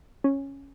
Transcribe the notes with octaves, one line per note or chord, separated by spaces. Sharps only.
C#4